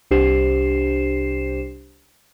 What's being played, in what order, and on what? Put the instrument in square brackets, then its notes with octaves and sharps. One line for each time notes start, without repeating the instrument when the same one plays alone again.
[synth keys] C2 D4 G4 C5 C7 E7